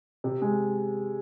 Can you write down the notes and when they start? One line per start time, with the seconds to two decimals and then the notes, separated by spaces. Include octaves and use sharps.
0.24 C3
0.42 G#3